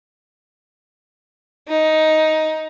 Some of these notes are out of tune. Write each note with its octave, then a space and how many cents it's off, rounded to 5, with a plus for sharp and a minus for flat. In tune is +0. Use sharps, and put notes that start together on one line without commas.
D#4 +10